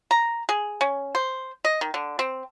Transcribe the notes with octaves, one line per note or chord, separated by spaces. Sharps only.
A#5
G#4
C#4
C5
D#5
D#3
D3
C4